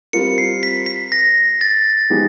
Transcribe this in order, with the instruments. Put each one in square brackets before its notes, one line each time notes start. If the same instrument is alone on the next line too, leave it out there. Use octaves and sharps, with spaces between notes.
[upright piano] G3 C4 F4 A#4 [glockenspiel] C#7
[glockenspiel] C7
B6
B6
A#6
A6
[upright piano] F3 G#3 B3 D#4 G4